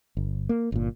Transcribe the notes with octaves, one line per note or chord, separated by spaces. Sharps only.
G1
A#3
G1 A#2